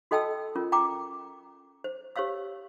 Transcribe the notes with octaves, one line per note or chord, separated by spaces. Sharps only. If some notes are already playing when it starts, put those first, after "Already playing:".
F#4 A4 D#5 G5 A5 E6
C#4 F4 A#4
G5 A#5 D6
C5
G4 C5 C#5 F5 E6